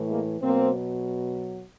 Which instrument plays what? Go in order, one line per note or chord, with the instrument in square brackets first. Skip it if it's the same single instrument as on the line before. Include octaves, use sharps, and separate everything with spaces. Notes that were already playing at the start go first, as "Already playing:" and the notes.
Already playing: [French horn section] A2 E3
G#3 A#3
B2 F#3 A#3 C4